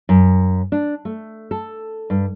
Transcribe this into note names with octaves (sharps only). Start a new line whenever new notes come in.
F#2
D4
A3
A4
G2